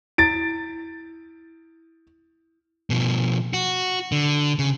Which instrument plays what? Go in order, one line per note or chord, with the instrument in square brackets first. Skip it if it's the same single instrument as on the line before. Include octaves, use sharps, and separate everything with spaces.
[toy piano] E4 [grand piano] A6 D7
[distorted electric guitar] B2 F3
F#4
D3
C#3